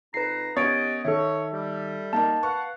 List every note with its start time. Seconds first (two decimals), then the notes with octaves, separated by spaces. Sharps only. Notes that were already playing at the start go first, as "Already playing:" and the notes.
0.14 F2 D#4 B4 A#5 C7
0.57 D#3 B3 C#4 G4 C#5 D#5 A6 D7
1.05 D#3 A4 C#5 E5
1.53 G3
2.13 A#3 D#4 A#4 A5
2.43 B4 F5 F#5 C#6